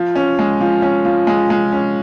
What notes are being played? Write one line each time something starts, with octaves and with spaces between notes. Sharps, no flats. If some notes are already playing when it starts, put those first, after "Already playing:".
Already playing: F3
C#4
G#3
F3
C#4
F3
G#3
G#3
C#4